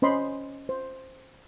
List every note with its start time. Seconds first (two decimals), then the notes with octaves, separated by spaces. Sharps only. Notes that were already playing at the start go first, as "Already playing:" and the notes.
0.02 C#4 C5 D#5 B5 C6
0.69 C5